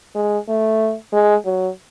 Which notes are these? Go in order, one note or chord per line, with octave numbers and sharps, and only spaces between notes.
G#3
A3
G#3
F#3